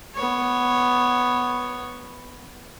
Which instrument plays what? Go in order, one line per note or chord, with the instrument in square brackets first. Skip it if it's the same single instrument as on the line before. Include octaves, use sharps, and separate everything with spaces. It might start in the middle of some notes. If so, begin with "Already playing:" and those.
[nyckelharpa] B3 C#5